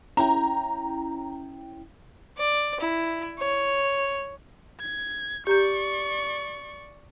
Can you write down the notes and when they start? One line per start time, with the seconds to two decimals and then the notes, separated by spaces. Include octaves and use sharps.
0.17 C#4 E4 G5 A#5
2.38 D5
2.80 E4
3.39 C#5
4.80 G#6
5.47 G4 D5 A#5 C#6 G6